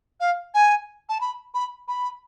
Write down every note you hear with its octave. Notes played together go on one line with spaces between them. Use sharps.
F5
G#5
A5
B5
B5
B5